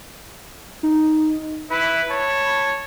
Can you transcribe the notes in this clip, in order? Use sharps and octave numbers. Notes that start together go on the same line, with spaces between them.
D#4
E4 B4 B5
C#5 A5